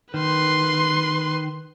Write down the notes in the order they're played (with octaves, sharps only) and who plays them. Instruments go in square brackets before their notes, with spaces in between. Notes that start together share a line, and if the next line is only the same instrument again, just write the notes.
[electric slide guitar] D#3 [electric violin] B4 C6